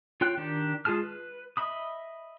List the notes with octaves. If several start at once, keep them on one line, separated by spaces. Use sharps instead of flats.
F4 C#5 G5 F#6
D#3 D4 G4
G#3 F4 G#4 A5 F6
B4
D#5 E5 B5 D#6